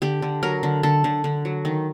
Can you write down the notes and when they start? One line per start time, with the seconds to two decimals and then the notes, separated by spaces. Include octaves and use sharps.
0.02 D3 G4
0.22 D3
0.43 F#3 A#4
0.63 D3
0.83 D3 A4
1.04 D3
1.24 D3
1.45 F#3
1.65 D#3